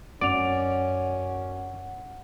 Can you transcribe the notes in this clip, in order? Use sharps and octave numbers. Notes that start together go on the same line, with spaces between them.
F#2 C#4 D5 F#5 F7